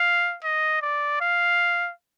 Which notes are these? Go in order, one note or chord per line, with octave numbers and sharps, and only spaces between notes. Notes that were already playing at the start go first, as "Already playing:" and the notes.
Already playing: F5
D#5
D5
F5